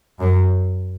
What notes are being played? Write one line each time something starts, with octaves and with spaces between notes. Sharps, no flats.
F#2